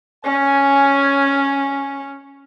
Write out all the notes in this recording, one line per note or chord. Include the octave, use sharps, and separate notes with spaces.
C#4 G#5